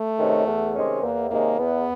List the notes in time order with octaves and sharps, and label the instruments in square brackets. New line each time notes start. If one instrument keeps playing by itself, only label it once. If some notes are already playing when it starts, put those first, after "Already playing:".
Already playing: [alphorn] A3
[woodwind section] C3 D#3 G#3 C#4
E2
C3 D#3 G#3 C#4
[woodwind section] E2 [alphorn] A#3
[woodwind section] C3 D#3 G#3 C#4 [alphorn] A#3
[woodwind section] E2 [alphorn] B3